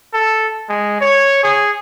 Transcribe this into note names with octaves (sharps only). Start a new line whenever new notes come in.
A4
G#3
C#5
G#4